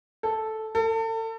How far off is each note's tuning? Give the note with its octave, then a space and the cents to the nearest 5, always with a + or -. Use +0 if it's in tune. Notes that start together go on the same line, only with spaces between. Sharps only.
A4 -5
A4 +35